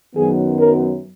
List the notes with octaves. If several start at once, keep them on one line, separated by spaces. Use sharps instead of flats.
F#2 D#3 F#3 B3 G#4
A#4